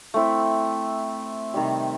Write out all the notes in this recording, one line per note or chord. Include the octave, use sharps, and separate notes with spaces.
A3 C4 E4
C3 D#3 G3